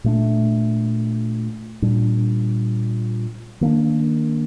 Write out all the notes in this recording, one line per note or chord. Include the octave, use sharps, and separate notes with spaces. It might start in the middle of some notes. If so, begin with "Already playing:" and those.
A#2 A3 D4
A#2 G3 D4
D#3 A#3 D4